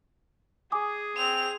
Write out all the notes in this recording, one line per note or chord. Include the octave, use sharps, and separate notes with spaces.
G#4 G#5 D6 D#6
C4 F7